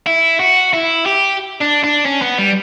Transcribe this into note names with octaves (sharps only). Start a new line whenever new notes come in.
E4
F#4
E4
G4
D4
D4
C#4
B3
G3